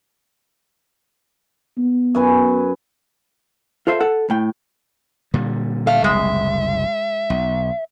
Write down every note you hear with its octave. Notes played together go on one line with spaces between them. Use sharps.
B3
F#2 B4 G#5
F4 A4 C5 E5 F5
A4 F#5
A2 G5
A#2 D3 G3
A4 E5 F5
F#1 C2 G#3 E5
B1